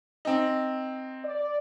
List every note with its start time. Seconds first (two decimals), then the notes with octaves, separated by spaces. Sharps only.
0.25 C4 D#4
1.23 D5